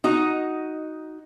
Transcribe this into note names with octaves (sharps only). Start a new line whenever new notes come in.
D#4 F#4 D#5